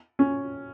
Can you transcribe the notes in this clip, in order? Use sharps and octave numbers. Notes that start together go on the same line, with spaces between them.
C#4